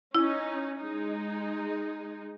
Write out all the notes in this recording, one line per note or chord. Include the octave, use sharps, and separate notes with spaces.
C#4 D#4 E4
G#3 D#4